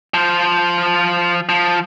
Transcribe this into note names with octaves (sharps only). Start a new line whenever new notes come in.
F3 C5
F3